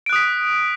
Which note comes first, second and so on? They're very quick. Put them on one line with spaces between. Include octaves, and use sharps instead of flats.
D7 F#6 D#6 B6